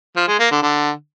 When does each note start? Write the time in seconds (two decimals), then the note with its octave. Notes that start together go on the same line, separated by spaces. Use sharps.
0.16 F3
0.28 G#3
0.39 A#3
0.51 D3
0.62 D3